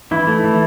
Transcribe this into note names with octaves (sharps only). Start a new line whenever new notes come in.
E3 E4
A3
E3